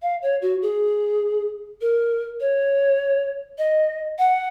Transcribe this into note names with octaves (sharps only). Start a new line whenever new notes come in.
F5
C#5
F#4
G#4
A#4
C#5
D#5
F#5